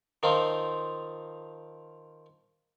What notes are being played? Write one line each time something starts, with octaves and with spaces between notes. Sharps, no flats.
D#3 F3 C4 D#4 F4